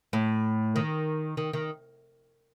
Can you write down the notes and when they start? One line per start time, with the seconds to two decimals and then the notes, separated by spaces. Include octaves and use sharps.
0.13 A2
0.76 D#3
1.37 D#3
1.53 D#3